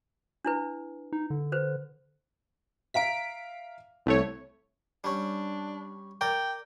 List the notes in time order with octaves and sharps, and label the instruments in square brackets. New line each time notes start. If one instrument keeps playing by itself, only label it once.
[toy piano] D4 E4 B4
[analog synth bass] D#4
D3
[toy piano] B4 C5
[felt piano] E5 F5 A#5 [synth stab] B6 D7
[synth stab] C2 A3 C#5
[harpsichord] G3 C#4 [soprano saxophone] D4
[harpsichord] A#4 D5 A#5 [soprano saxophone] G5